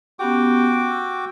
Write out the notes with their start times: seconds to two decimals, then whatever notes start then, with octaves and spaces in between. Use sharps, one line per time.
0.19 B3 C#4 F#4 G4 G5 D6
0.90 E6